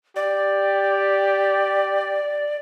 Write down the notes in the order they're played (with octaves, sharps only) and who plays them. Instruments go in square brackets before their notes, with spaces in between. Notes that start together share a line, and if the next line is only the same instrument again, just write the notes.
[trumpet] G4 [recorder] D5